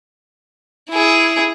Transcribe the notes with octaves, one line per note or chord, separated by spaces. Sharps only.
E4 G#4